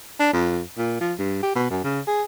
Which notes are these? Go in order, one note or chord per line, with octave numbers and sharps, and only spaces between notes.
D4
F2
A#2
F3
G2
G4
B2
F#2
C#3
G#4